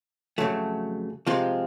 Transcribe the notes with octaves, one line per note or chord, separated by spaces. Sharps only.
F2 C#3 F#3 A3
C3 F3 G#3 C4 F4